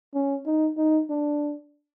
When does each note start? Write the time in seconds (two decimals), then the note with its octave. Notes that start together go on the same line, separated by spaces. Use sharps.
0.14 C#4
0.46 D#4
0.77 D#4
1.10 D4